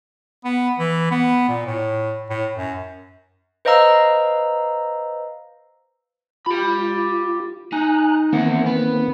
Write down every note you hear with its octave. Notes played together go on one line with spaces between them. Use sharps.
B3
E3
B3
A#2
A2
A2
F#2
B4 C5 D#5 F5 A#5 E6
F4 G4 B5
D#4 G#5 A#5 F#6
E2 D#3 A#3 C4 F#5
B3